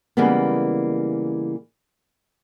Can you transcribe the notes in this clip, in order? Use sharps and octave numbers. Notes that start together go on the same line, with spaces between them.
C#3 E3 G3 G#3 A#3 B3